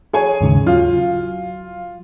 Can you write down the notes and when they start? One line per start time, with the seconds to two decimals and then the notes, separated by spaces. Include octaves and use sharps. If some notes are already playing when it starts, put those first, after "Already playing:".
0.13 G#4 C#5 G#5
0.41 D#2 G#2 C#3
0.66 F#3 F4 F5